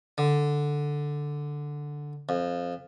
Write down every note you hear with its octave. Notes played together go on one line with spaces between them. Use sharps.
D3
F2